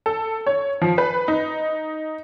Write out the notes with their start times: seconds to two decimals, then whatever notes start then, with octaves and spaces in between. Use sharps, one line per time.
0.06 A4
0.46 C#5
0.82 F3
0.98 B4
1.28 D#4